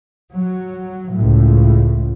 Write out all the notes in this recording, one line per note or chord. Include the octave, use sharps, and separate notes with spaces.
F#3
C#2 A2